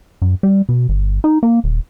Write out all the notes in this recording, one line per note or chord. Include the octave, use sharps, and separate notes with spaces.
F#2
G3
B2
G1
D#4
A#3
D#1